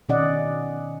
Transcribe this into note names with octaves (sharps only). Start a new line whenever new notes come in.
B2 D#3 C#4 D5 D#5 F#5